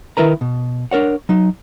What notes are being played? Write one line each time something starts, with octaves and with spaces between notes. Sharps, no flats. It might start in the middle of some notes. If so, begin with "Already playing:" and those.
D#3 E4 A#4 B4 A#5
B2
D4 A#4 C#5 F#5
F#3 D#4